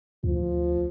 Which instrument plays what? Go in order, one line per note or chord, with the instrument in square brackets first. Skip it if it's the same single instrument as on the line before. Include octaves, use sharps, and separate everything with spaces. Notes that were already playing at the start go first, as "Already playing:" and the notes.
[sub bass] D2 [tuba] F3